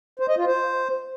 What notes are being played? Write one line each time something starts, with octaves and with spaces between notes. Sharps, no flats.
C5
D#5
F4
C5